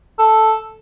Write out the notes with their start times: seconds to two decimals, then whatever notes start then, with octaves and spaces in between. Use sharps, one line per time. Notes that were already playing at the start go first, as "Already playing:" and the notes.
0.19 A4